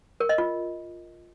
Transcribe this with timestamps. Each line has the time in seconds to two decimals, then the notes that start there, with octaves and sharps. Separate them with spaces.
0.20 A#4
0.29 D#5
0.38 F4